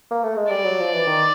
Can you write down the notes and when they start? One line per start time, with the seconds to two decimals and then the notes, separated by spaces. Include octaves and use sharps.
0.11 A#3
0.24 A3
0.37 G#3
0.50 G3 D5
0.64 F#3
0.79 F3
0.93 E3
1.07 D#3